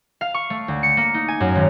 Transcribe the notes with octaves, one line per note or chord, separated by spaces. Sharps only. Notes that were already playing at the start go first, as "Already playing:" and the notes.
F5
C#6
A3
D2
C#7
A#3
D#4
G#5
F#2
G#1